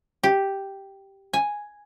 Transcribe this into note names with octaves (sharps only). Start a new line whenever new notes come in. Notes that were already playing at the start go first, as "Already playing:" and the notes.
G4
G#5